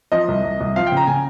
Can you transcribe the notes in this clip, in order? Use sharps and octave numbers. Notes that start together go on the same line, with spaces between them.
F3 D#5
C2
C2
C2
F3 F5
G5
C#3
A#5
C#3 G#5